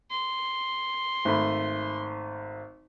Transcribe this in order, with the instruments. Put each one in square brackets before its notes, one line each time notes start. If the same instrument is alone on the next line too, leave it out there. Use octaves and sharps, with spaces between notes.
[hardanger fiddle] C6
[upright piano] G#1 A3 B5